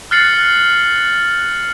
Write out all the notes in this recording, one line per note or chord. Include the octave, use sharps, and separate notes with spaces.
F6 F#6 A6 C7 C#7 F#7